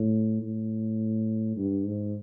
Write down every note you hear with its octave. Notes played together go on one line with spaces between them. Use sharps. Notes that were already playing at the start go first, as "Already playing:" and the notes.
Already playing: A2
A2
G2
G#2